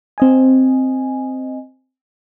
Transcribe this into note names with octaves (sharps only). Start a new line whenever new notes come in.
C4 D#5 G#5